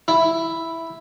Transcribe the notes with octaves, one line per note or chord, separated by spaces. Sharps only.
E4